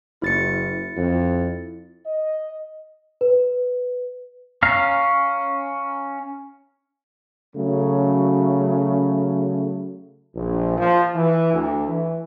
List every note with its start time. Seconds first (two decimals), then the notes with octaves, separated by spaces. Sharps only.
0.22 F#1 E4 A6 C#7
0.96 F2
2.06 D#5
3.21 B4
4.63 C#4 F5 A#5 F6
7.56 C#3 F#3 A3
10.35 A#1
10.77 F3
11.14 E3
11.52 D2
11.87 E3